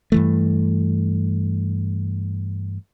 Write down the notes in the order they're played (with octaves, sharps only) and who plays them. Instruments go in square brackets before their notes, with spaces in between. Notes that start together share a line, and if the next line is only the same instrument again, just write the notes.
[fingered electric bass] G2 E3 A3